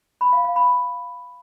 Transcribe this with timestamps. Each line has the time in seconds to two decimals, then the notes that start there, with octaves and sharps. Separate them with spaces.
0.21 B5
0.33 F5
0.44 F5
0.56 B5